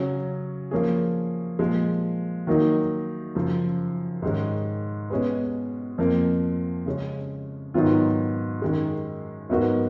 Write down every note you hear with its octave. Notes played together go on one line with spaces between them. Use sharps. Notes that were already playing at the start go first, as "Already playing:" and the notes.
Already playing: C#3 F#3 C#4
F3 A#3 C#4 G#4
A#2 F3 G#3
D#3 F#3 A#3 D#4
F#2 C#3 F3
G#2 D#3 G#3 C#4
B2 G#3 C#4 G#4 B4
F2 F3 A#3
C#3 G#3 C#4
G#2 D#3 F#3 B3 F4
F#2 D#3 G#3
G#2 F#3 B3 F#4 A#4